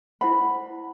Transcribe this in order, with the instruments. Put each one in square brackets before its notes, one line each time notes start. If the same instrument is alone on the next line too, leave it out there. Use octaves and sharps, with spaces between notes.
[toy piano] E4 C5 F#5 [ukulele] B5